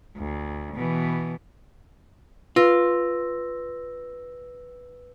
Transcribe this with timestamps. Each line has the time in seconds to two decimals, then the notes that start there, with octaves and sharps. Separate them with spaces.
0.17 D2
0.75 B2 E3
2.56 F4 B4 E6 A#6